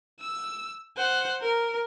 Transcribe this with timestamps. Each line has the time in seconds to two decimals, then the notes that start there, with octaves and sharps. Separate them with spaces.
0.20 E6
0.96 C5 F#5
1.41 A#4